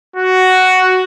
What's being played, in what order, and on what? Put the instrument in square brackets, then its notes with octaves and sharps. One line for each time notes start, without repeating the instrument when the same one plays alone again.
[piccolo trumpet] F#4